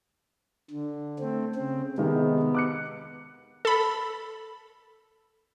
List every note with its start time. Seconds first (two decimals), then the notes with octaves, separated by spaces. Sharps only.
0.71 D3
1.19 A3 C4
1.55 C#3 C4
1.98 C3 D#3 G#3 B3
2.55 D6 F#6 C#7
3.65 A4 B5